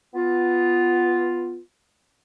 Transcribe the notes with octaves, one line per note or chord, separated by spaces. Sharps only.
B3 F4